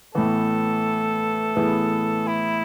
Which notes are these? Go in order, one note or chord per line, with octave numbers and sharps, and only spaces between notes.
A2 E3 B3 A4
A2 E3 B3 E4 G#4
E4